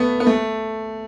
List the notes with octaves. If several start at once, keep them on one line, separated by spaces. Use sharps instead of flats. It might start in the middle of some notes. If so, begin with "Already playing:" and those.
Already playing: A3 B3
B3
A3